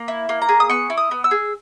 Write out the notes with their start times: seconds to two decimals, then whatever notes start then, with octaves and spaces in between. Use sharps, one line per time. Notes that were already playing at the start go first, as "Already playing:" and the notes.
Already playing: A#3
0.08 E4
0.29 A#3
0.42 A#5
0.49 G#4
0.60 D#6
0.70 B3 C#6
0.90 E4
0.97 D#6
1.11 B3
1.24 E6
1.31 G#4